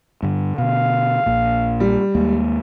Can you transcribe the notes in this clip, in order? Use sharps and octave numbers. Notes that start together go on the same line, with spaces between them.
G2 D3
B2 D3 F5
A#1 A#2
G3
D#2 G#3 A#3